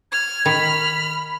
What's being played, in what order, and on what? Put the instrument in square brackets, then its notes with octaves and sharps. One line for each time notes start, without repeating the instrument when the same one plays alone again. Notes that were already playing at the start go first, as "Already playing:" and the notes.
[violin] F6 [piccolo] G#6
[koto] D#3 [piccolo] B5